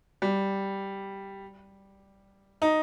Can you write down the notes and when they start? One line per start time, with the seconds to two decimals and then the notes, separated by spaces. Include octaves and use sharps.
0.22 G3
2.62 D#4